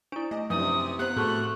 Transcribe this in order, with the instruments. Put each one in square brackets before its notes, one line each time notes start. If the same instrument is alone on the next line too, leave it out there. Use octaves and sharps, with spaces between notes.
[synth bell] D4 E4 [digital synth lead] D7
[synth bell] A3 [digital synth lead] D#5
[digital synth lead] F#2 [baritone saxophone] C3 [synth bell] F3 D4 E4 [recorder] D#6
[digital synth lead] B3 [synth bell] G4 C5 [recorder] F#6
[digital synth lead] A2 [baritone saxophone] A3 [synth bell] C4 F#4 G#4